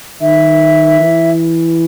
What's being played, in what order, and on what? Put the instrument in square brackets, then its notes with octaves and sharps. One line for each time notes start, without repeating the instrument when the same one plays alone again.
[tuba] D#3 [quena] E5
[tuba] E3